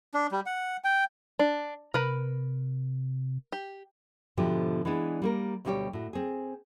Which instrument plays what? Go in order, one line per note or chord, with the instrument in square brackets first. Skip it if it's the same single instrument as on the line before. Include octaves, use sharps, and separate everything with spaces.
[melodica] D4
G3
F#5
G5
[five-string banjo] D4
[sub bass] C3 [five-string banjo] A#4 B4 B5
[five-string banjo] G4
[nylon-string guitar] G#2 B2 D3 F3 A3 G4
E3 G#3 B3 D4
G3 A#3 A#4
D2 B2 G3 D4 G4 C#5
A2 F#4
C4 G#4